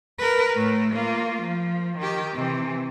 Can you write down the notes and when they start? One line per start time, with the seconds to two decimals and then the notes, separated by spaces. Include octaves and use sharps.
0.19 A#4 B4
0.56 A2 A3
0.93 A#3 F4
1.43 F3
1.98 D#3 G4
2.34 C3 E3